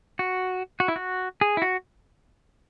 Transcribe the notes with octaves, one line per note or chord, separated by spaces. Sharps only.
F#4
F#4
E4
F#4
G#4
E4
F#4